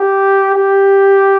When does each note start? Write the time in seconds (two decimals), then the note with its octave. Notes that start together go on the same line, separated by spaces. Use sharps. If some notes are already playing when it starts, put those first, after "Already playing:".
Already playing: G4
0.55 G4